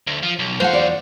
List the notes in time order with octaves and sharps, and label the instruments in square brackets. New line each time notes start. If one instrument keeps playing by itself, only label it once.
[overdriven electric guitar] D2
F3
B1
[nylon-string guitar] F3 A3 [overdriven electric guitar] F#3 F5 [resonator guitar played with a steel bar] C5 F#5
[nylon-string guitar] E2 F4 D5